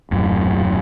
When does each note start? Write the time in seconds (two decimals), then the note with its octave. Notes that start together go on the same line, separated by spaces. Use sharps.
0.11 D#1 F#2 A2